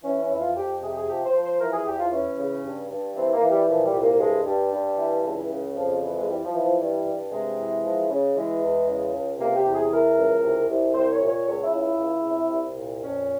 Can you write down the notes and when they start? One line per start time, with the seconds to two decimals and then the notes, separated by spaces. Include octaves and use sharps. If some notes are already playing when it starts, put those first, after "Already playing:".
0.03 E3 C#4
0.21 C#4
0.30 F2 E4
0.39 F4
0.56 F2 G4
0.81 C3 G#4
0.89 G4
0.96 G#4
1.08 F3 G4
1.25 C5
1.34 F3
1.42 C5
1.60 E3 A#4
1.72 G#4
1.85 E2 G4
1.98 F4
2.11 E3 C#4
2.38 C#3
2.64 G2
2.89 G2
3.15 E3 C4
3.33 A#3
3.41 E3
3.50 G3
3.67 A#2 F3
3.85 G3
3.93 C2
4.02 A#3
4.19 G2 G#3
4.45 G2 G3
4.72 G2
4.97 E3
5.24 C#2
5.49 C#3
5.75 F2 F3
6.01 E3
6.17 G#3
6.27 E3 G3
6.44 F3
6.53 E3
6.61 F3
6.79 G2 G3
7.05 G2
7.31 C3 G#3
7.57 E3
7.83 F3
8.09 C#3
8.35 E3 G#3
8.61 E2
8.87 C#3
9.13 C#2
9.38 C3 A#3
9.56 G4
9.65 E2
9.74 G#4
9.91 E3 A#4
10.17 C#2
10.43 C2
10.68 C2
10.94 C2 C5
11.12 C#5
11.21 A#2
11.29 C#5
11.47 C#2 C#5
11.64 E4
11.73 C#3
11.81 E4
11.98 C#2
12.25 C3
12.50 C2
12.77 A#2
13.02 F2 C#4